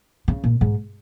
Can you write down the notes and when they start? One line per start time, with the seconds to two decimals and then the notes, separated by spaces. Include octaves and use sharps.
0.28 C#3
0.44 A#2
0.61 G#2